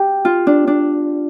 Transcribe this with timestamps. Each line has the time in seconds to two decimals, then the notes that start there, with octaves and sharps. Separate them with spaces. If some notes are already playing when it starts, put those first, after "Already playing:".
Already playing: G4
0.25 F4
0.47 D4
0.67 D4